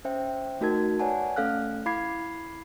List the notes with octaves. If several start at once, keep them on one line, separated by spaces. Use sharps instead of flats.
C#4 C5 E5 G5
A3 D#4 F#4 A#4 A5 G#6
B4 C#5 D5 F#5 G#5 A5
A3 C#4 A4 F5 F6 F#6
E4 F5 B5 D6 G#6 C7